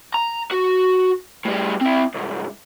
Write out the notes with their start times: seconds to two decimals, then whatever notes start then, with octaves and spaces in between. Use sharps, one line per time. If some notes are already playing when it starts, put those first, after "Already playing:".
0.14 A#5
0.51 F#4
1.46 A2 G3
1.81 C4 E4
2.15 C2 G#2